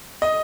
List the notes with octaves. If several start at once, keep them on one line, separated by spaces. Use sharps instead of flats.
D#5